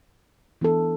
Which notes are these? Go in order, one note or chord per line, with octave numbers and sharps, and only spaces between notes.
E3 B3 D4 A4